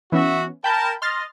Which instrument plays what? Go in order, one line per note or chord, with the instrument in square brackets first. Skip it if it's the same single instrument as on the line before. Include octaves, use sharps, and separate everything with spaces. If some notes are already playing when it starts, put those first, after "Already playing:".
[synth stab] E3 B3 C#4 [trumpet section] F#4 E5
[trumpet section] A#4 A5 [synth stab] G5 B5 G6
[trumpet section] D#5 [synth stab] C6 F6 A6